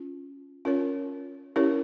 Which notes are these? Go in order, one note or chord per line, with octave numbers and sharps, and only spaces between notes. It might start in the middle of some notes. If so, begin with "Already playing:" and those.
Already playing: C#4 F4
C#4 F4 A#4 C#5
C#4 E4 G4 A#4 C#5